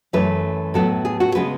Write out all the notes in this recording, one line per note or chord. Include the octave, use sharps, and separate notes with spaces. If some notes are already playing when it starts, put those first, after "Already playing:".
F#2 E3 A3 B4
A2 F#3 B3 A4
G#4
F#4
C#3 G#3 B3 B4